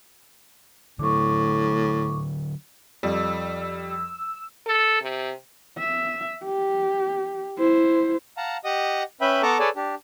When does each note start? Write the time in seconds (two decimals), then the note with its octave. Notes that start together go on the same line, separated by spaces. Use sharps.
0.99 A2 D3 F#3 C#6 D6
3.03 F2 G3 E6
4.67 A4
5.02 C3
5.79 E5
6.44 G4
7.58 E4 C5
8.37 F5 F#5 A5 A#5
8.64 G4 D#5 F#5 D#6
9.21 C#4 B4 E5 G5 B5
9.42 B3 A4 A5 A#5 C#6 D6
9.59 G#4 A4 B4 C#5 D5 A5
9.76 D4 G4